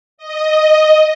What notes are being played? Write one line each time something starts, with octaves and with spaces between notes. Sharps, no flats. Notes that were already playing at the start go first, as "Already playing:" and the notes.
D#5